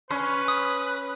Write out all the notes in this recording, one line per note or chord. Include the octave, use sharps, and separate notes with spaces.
C#4 B4 C6 C#6 F6
D#6